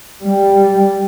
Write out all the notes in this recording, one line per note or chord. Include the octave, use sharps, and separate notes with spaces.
G3